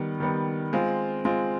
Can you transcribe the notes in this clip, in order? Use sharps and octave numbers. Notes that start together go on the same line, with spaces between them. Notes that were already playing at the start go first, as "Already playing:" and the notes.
Already playing: D#3 G3 B3
D#3 G3 B3
G#3 C4 F4
G#3 C4 F4